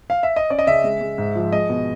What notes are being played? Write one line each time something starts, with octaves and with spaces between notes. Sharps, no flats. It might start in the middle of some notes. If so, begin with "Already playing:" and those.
F5
E5
D#5
C#4 D5
D#5
C#3 E5
G#3
G#3
G#2
F3
G#3 D#5
B2